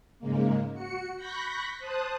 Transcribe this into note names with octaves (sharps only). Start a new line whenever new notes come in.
G#2 C#3 G#3 A#3
F#4 C#7
B5 C#6 F#6 G6 A#6 B6
C5 A5 D#6 F#6